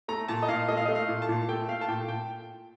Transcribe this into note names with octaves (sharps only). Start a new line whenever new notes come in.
A3 A#5
A#2 A5
D#5
A#2 F5
A3 D#5
F5
A3 D#5
F5
A#2
A5
A#2
A3 G5
A3 F5
A5
A#2 G5
A#2 G5